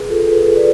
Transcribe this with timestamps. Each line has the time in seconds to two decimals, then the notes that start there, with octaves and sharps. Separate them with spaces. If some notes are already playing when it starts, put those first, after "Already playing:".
Already playing: G#4 B4
0.09 F4 A4
0.32 G#4 B4
0.56 B4 D5